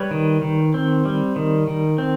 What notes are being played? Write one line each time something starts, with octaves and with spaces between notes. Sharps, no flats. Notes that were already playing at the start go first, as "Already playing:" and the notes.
Already playing: G3 B4 C#5
D#3
D#3
C4
G3
D#3
D#3
C4